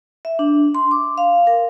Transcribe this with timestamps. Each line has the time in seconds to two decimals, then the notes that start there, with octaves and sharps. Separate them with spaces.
0.25 E5
0.39 D4
0.75 C6
0.91 D6
1.18 F5
1.47 A#4